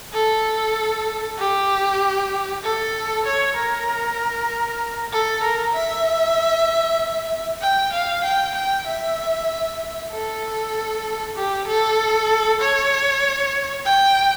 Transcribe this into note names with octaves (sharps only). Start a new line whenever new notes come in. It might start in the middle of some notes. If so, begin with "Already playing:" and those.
A4
G4
A4
C#5
A#4
A4
A#4
E5
G5
F5
G5
G5
E5
A4
G4
A4
C#5
G5